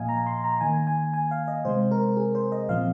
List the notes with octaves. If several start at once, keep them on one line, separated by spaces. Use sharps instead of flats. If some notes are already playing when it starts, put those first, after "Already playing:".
Already playing: A#2 F3 A#3 D#5 F5 G#5
A#5
C6
A#5
D#3 A#3 G#5
G#5
G#5
F5
D#5
C3 G#3 C4 C5
A#4
G#4
C5
D#5
A#2 F3 C4 F5